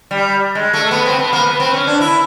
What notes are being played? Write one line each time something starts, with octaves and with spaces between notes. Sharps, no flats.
G3
G#3
A3
B3
C4
B3
A#3
B3
C4
C#4
D4
E4